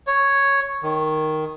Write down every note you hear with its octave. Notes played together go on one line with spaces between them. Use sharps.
C#5
D#3